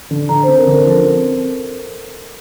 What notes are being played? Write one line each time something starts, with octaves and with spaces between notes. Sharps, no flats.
D3
D3 A#5
C5
C4
A#4
D3 A#4
F3 A4
C4